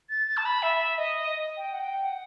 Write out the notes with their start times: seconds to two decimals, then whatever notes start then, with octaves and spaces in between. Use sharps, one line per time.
0.09 A6
0.27 A6
0.37 A5
0.45 B5
0.62 E5
0.98 D#5
1.57 G5
1.72 F#5
1.80 G5
2.04 F#5